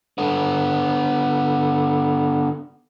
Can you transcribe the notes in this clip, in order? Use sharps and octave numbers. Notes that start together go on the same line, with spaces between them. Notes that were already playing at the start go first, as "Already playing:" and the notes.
D3 B3